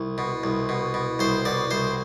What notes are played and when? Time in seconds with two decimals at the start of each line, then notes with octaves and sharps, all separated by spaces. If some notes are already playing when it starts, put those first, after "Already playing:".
Already playing: C2
0.18 B2
0.44 C2
0.69 B2
0.94 B2
1.19 C2 C5
1.45 B2 D5
1.71 C2 C5